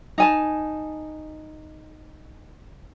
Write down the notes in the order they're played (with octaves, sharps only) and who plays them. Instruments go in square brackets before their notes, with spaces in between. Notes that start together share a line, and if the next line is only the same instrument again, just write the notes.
[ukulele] D#4 G#5 A5